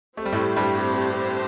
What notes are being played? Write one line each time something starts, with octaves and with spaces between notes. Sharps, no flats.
A3 C4 G4 C5
G3
A2 A3
G2 G3